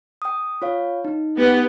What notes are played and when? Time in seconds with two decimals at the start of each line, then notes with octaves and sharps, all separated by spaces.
0.22 G5 D#6
0.62 F4 C#5 F5
1.05 D#4
1.37 B3 G4 B4